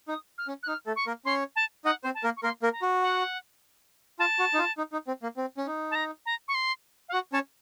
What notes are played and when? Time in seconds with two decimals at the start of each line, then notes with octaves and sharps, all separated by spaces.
0.08 D#4 D#6
0.38 F6
0.48 C#4
0.63 F#6
0.68 D#4 F6
0.87 A3 A4
0.96 C#6
1.07 A#3 A#4
1.25 C#4 C#5 C6
1.56 A5
1.85 D#4 D#5 F#5
2.04 C4 C5
2.15 A5
2.23 A#3 A#4
2.37 C#6
2.43 A#3 A#4 C6
2.62 A#3 A#4
2.72 A#5
2.82 F#4
3.02 F#5
4.19 F4 A5
4.39 F#4
4.54 D#4
4.59 F4
4.78 D#4
4.93 D#4
5.08 C4
5.23 A#3
5.37 C4
5.57 C#4
5.67 D#4
5.91 A5
5.95 A#5
6.26 A#5
6.48 C#6
6.55 C6
7.09 F5
7.13 F#4 F#5
7.32 C#4 C#5 A5